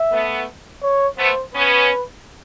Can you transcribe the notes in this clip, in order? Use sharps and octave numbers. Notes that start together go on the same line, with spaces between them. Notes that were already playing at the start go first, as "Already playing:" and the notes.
Already playing: E5
A3 B3
C#5
A3 B3 C5
B3 C#4 B4